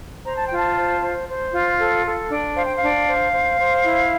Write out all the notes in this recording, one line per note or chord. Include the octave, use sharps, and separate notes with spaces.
C5 A#5
A5
F4 G5
A5
C5
C5
C5
F4
A4
A4
D4
C5 F5
G5
D4 F5
C5
C5
C5
E4